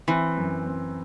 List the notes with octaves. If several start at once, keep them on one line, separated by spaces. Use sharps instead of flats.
E3 C4
F#2
C4